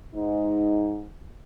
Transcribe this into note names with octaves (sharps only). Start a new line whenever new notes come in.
G#2 D#4